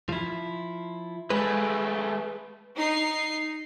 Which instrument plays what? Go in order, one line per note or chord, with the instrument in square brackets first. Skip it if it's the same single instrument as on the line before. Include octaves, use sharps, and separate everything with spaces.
[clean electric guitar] F3 E4
[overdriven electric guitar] G#3 A3 [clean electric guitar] B4
[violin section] D#4 C7